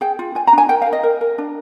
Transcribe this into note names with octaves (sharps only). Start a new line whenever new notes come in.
G#4 G5
F4
F4 G#5
A#5
D4 G#5
A#4 G5
F5
A#4
D#5
A#4
A#4
D4